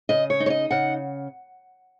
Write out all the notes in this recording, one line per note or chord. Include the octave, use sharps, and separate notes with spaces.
C#3 D#5
C#5
D#4
C#5
D#5
C#3 F#5